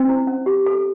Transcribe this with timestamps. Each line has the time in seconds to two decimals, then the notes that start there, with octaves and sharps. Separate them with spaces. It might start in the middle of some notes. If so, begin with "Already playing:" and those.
Already playing: C4 C5
0.09 E4
0.27 C#4
0.46 G4
0.66 A4